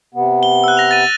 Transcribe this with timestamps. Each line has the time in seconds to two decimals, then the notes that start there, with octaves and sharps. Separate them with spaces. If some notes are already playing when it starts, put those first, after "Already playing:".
0.14 C3 B3
0.43 G7
0.64 E6 F#6
0.77 A#6 F7
0.91 A6 D#7